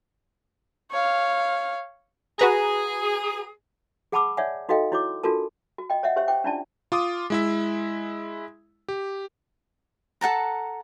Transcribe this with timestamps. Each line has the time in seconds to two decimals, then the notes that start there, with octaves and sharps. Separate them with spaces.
0.91 C#5 F5
2.39 F#4 G#4 B4 A#5
4.12 G#4 F#5 A5 B5 D6 E6
4.37 C#5 D5 E5 F#5 G#5
4.69 D#4 F#4 A4 D#5 F5 G5
4.92 E4 F#4 C#5 C6 D6
5.24 D4 F4 F#4 A4 A#4 A5
5.78 F#4
5.90 D#5 G5
6.03 C#5 D#5 E5 F#5
6.16 G4 C5 C#5 E5 C#6
6.28 C5 G5 D6
6.44 C#4 D4 E4 F4 D5 A5
6.92 F4 D6 D#6
7.30 G#3 E4 E5
8.88 G4
10.21 A4 F#5 A5 A#5